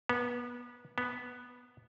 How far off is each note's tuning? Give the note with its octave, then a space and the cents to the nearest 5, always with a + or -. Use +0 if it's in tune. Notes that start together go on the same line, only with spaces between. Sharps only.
B3 -25
B3 -5